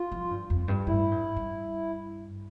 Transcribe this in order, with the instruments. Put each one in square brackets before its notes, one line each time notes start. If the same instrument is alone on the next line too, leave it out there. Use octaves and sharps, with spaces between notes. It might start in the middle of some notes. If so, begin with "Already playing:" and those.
Already playing: [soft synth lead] F4
[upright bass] F3
G2
F2
G2
[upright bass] A2 [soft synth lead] E4
[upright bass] G2
G2